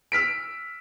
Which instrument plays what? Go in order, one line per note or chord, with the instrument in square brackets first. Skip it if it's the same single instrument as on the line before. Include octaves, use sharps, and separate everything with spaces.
[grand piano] E6 F6 B6 D7